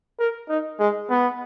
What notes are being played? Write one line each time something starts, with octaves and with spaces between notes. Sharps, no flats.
A#4
D#4
G#3
B3